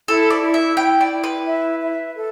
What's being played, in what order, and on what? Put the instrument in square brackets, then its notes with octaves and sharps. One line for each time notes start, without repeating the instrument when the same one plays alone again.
[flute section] E4 [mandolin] A4
[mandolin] D5
[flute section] E4
[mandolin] E5
[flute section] E4 [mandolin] G5
[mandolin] D5
[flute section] E4
[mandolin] B4
[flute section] E5
E5
A4